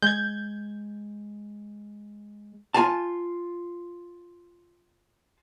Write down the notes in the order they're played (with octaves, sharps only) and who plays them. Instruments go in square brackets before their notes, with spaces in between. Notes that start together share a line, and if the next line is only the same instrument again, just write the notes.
[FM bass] G#3 [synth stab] G6 G#6
[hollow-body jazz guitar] F4 G#5 A5